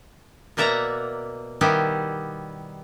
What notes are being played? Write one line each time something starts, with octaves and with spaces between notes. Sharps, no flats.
B2 A#3 D5 E5 F#5 A#5
D#3 G3 B3 E4 G4